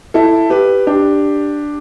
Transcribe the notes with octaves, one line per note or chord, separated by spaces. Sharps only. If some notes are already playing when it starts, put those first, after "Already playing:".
E4 A4
G4 B4
D4 G4